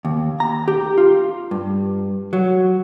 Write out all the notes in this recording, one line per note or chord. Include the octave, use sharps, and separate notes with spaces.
D#2
A#5
G4
F4
G2
F#3